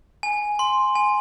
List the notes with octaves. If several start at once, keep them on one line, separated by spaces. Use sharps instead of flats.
G#5
C6
G#5